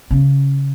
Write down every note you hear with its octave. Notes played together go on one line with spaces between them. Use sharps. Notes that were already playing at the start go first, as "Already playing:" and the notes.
C#3